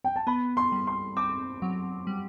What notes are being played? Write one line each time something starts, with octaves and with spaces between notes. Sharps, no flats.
G5
A5
B3 B5
C6
G3
C6
C4 D6
F#3
G3